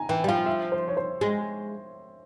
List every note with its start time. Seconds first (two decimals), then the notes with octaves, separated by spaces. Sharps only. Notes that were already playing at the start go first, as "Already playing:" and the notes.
Already playing: G#5 A#5
0.09 E3 G5
0.24 G3
0.28 F3 F5
0.46 E5
0.72 C5
0.88 C#5
0.97 C5
1.21 G#3